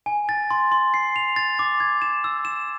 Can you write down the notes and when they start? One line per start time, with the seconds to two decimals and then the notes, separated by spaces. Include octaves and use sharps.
0.06 G#5
0.29 A6
0.51 C6
0.72 C6
0.94 C7
1.16 F7
1.36 A6
1.59 D6
1.80 G#6
2.02 E7
2.24 E6
2.45 E7